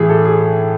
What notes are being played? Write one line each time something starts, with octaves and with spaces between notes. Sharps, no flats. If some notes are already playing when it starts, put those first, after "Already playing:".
Already playing: A2 E3 G#4
A4
G#4